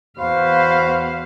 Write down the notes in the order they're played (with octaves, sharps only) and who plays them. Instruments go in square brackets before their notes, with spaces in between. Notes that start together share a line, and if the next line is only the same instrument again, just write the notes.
[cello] E2 F5 [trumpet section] F#4 C5 B5